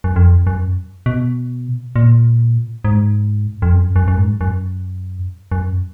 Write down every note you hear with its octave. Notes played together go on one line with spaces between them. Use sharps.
F#2
F2
F#2
B2
A#2
G#2
F2
F#2
F#2
F#2
G#2
F#2
F#2